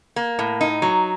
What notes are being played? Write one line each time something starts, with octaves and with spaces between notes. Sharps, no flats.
A#3
A2
D#4
F#3